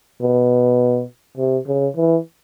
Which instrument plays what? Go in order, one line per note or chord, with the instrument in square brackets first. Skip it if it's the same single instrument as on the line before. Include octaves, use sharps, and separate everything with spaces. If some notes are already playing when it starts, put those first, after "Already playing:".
[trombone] B2
C3
C#3
E3